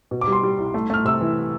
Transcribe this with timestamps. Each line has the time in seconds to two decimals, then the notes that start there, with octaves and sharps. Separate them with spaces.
0.11 B2
0.21 D6
0.27 G3
0.32 C6
0.43 G3
0.58 C2
0.74 A3
0.90 A3 F6
1.05 C3 E6
1.21 E3